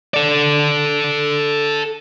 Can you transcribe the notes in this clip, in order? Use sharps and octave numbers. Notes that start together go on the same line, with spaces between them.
A4 D5